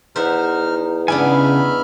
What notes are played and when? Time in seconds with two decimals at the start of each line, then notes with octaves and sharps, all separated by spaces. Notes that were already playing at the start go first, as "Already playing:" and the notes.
0.16 E2 D#4 C5 E5 F#5 F6
1.08 C#3 B3 D4 D#4 E5 G#5 B5 F6